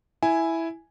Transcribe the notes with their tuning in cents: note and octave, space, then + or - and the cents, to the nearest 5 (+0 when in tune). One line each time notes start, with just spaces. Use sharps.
E4 +0 G#5 +0